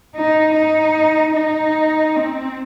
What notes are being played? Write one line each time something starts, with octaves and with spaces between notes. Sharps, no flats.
D#4
D#4
D#4
C4